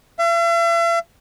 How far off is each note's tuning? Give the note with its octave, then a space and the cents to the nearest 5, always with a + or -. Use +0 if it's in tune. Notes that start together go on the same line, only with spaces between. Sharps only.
E5 +45